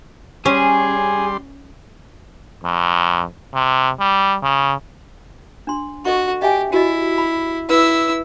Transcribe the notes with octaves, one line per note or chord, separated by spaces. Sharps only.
G3 C#4 G#4 C6
F2
C3
G3
C#3
D4 C6
F#4 A4 D#5 C#6
G4 D#5 E5 G#5
E4 F#4 G4 D#5
B5
E4 B4 E6